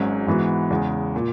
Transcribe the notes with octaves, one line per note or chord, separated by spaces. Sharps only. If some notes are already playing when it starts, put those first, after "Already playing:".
Already playing: G#1 G#2 F#3 C#4 F#4
G#2 E3 B3 F#4
E2 C#3 G#3
A#2